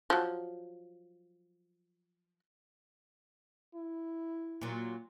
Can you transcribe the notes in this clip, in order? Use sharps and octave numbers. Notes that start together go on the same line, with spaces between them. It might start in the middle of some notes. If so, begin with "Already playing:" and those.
F3 F#3
E4
A#2 F#3